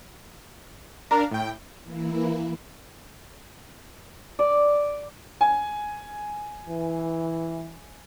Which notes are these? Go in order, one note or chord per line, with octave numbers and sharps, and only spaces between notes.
D4 A#4 F5 A#5
A2 G5
E3 A#3 E4
D5
G#5
E3